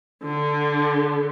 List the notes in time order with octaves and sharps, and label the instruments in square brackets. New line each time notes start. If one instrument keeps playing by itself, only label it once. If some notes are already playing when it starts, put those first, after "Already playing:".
[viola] D3